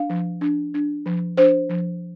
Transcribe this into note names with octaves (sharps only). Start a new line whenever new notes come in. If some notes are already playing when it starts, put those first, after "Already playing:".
Already playing: D4 F5
F3
D4
D4
F3
D4 C5
F3